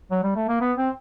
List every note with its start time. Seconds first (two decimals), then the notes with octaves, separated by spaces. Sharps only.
0.11 F#3
0.23 G3
0.36 A3
0.48 A#3
0.61 B3
0.78 C4